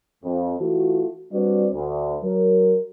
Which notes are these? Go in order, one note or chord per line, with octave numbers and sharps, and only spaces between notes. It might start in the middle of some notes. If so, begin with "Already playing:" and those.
F2
E3 A3 F4 F#4
G3 C4 D4 F#4 B4 D5
D2
F#3 A#4